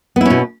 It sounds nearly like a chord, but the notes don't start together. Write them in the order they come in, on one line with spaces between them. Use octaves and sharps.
B3 E4 C#4 B2